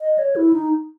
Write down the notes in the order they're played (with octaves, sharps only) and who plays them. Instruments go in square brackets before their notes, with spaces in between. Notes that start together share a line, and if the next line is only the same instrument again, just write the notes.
[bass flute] D#5
C#5
E4
D#4